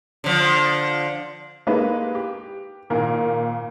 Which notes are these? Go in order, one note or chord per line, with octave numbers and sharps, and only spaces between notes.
D3 F3
G#3 A#3 D#4 G4 B4
G4
G#1 A#2 A#4